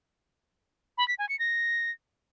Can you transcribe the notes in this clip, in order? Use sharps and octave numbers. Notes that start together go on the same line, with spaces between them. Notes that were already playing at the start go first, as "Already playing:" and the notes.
B5
B6
G#5
C#7
A#6